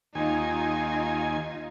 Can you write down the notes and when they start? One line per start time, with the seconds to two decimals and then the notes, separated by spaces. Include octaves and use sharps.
0.15 D#2 D#4 F4 G#5